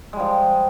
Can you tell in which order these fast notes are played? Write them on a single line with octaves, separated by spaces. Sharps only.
G#3 G3 F3